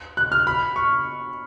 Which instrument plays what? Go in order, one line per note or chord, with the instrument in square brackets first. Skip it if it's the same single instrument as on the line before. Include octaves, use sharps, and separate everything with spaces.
[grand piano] F#6
F6
B5
C#6